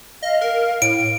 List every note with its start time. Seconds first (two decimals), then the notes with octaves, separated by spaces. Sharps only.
0.22 D#5 F5
0.41 A#4
0.82 A2 D7